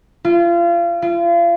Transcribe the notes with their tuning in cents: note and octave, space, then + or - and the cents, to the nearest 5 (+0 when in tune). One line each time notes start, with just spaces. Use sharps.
F4 -30
F4 -35